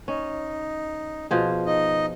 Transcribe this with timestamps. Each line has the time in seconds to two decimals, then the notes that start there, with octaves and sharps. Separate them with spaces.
0.08 C#4 D#4
1.31 B2 F3 G#4
1.66 D#4 D#5